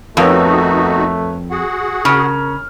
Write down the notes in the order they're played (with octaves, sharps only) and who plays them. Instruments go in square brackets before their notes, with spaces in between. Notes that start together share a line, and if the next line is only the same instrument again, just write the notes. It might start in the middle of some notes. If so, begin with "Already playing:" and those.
[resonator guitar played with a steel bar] F2 [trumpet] A3 [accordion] B3 D#4 F#4 [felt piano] A#4 B4 C#5
[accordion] F#4 G#4 F#5
[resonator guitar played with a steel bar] C#3 [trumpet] A#4 [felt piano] C#6 F6